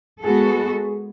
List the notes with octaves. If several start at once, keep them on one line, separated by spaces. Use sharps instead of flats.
G#3 B3 F#4 G#4 A4